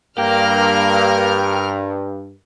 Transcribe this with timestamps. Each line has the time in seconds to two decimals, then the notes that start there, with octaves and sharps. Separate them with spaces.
0.18 G2 A#3 G4 A#4 F6